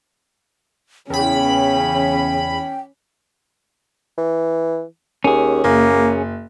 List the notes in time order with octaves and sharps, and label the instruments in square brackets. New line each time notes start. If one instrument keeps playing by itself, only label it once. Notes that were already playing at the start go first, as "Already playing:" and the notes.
[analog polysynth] E2 B5 [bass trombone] C#3 [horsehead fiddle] C#4 [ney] G5
[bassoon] E3
[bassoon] D#2 [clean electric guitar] C#4 G#4
[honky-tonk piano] F#1 [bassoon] A#3